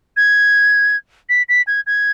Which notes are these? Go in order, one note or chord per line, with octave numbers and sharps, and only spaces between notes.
G#6
B6
B6
G#6
G#6